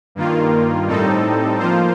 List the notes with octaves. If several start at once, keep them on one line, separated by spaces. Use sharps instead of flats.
G2 D#3 A#3 F4
A2 G3 C4 D#4 A4
F3 A#3 F4 C5